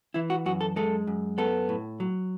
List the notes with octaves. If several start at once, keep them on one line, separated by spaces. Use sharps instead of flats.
E3 E4
F#4
F#2 F#4
A4
G#3 A4
F#2
B3 A4
A2
F#3